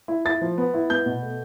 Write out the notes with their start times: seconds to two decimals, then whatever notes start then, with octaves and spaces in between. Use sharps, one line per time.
0.08 E4
0.25 E4 A6
0.41 F3
0.58 B3
0.74 E4
0.90 B3 G6
1.06 B2
1.22 A3